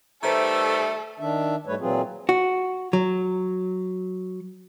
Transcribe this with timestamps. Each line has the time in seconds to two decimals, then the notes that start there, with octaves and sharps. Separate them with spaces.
0.23 D#3 G3 A3 A4 B4 C5 E5 A#5
1.20 D#3 D4 E5
1.67 G#2 G3 A3 B4 C#5
1.80 A#2 E3 F#3 C4 F4 G#4
2.29 F#4
2.93 F#3